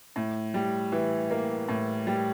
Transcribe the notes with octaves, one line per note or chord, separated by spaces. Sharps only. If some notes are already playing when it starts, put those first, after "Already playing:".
A2
G3
E3
A#3
A2
G3